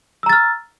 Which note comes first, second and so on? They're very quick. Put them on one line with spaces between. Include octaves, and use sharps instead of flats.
E6 A#5 A6 F6